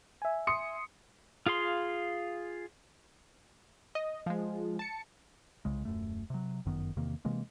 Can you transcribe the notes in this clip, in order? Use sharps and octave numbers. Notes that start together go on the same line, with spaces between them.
E5 G#5
C6 D#6 C#7
F4 G#4 F5 C6
D#5
F3 G#3
A5 C#7
C2 C#3 G#3
D#1 F#2 A3
C3 F#3
G1 F#2 D#3 B3
E2 C3 D#3 A#3
C3 E3 G#3 A#3